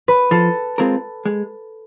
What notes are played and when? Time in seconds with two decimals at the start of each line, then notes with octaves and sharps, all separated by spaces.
0.08 B4
0.31 F3 A4
0.78 G#3 C4 F4 A#4
1.25 G#3